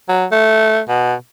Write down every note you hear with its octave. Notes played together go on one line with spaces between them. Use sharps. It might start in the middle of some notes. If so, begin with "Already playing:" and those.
F#3
A3
B2